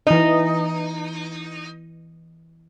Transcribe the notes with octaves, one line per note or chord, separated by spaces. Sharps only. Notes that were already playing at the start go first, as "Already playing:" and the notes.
E3 D#4 D#5